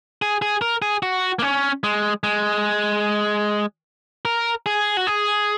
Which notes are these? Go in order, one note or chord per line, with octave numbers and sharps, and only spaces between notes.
G#4
G#4
A#4
G#4
F#4
A#3
C#4
G#3
G#3
A#4
G#4
F#4
G#4